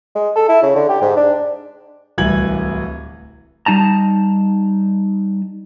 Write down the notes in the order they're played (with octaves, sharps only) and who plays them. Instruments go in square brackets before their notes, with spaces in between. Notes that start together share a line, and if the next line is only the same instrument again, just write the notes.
[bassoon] G#3
A4
E4
C#3
D3
G4
G#2
D4
[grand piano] D1 C2 E3 G#6 F#7
[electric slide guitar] G3 D#4 A5 A#5